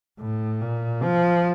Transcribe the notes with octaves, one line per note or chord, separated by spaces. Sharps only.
A2
A#2
F3